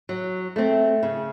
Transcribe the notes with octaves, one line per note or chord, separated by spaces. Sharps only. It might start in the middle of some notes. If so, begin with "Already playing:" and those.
F#3
A3 C4
C#3